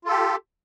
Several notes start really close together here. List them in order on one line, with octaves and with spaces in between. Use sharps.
F4 A4 G4